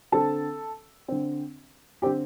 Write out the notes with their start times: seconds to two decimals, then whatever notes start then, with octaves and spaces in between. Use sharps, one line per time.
0.12 D3 C4 A4 A5
1.08 D3 C4
2.02 D3 C4 G4 G5